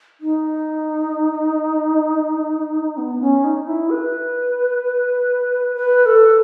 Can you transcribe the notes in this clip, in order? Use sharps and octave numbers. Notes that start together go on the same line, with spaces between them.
D#4
B3
C#4
D#4
E4
B4
B4
A4